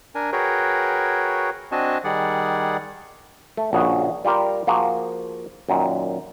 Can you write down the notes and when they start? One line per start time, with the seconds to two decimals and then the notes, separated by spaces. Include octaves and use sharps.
0.15 D4 A#4 G#5
0.32 F#4 G#4 A#4 B4 C#5 G5
1.72 C4 D4 F#4 D#5 G#5 A5
2.04 D#3 G3 G#4 D5 F#5
3.57 A3
3.73 A#1 C#3 F#4 G#4 C#5 D#5
4.25 G3 F4 G4 A#4
4.67 F3 A#3 F#4 G#4
5.69 F#2 A#2 D#3